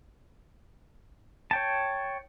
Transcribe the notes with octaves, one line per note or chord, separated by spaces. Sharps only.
C#5 G5 A5